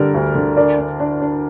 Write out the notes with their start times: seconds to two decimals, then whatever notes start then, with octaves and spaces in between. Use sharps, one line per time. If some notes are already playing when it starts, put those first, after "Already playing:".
Already playing: D3 G3 A#4 D5
0.14 D2
0.35 D3
0.57 D4 A#4 D5
0.79 D4
1.00 D4
1.22 D4